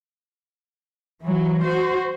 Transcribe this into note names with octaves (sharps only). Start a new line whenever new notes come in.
E3 F#3
F#4 C5